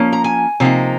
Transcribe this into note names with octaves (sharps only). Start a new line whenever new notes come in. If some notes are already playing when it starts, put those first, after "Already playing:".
Already playing: F3 A#3 C#4
A#5
G#5
C3 F3 A#3 D#4